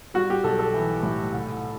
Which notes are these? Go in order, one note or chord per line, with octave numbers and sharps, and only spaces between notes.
G3 F#4
G4
B1 A4
A4
E3
A2
C2